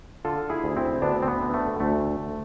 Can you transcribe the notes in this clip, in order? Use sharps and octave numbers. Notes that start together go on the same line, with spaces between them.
D3 F4 A4
E4 G#4
D2
C4 E4
D2 B3 D4
C4
B3
D3
A3
D2 A3